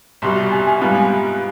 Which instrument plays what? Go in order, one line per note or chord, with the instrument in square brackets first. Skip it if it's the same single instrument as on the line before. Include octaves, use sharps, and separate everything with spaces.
[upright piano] C2 B2 G3 [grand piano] C6
[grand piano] G#5
G#5
[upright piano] G#2 G3 B3 F4 [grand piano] G#5